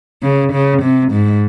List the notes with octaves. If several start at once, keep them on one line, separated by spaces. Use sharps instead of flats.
C#3
C#3
C3
G#2